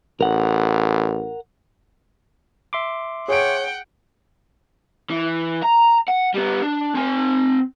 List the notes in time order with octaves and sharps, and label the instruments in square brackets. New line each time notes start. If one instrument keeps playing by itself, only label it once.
[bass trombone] A1 [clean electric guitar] A#4 F#5
[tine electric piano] E5 C6 D6
[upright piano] G#4 D7 [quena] C#5 [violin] F#5 G5
[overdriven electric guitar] E3
A#5
F#5
G3 B3
D4
C4 G#5